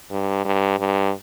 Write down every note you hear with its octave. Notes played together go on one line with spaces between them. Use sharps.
G2
G2
G2